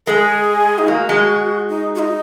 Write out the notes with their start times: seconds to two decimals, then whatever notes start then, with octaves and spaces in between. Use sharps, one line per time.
0.06 G#3 G#4 A#4
0.78 D#4
0.88 A#3 F#4
1.09 G#3
1.69 D#4
1.95 F#4
1.99 D#4